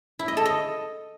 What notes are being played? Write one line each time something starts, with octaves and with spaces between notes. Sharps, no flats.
E4
D#5
A4
D#5